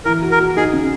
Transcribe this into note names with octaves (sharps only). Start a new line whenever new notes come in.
E3 A#4
F#4
A#4
F#4
D#4 G#4
C#3